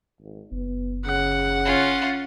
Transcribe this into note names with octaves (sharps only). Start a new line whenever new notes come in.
G#1
F#1 B3
C#3 F#5
C#4 F4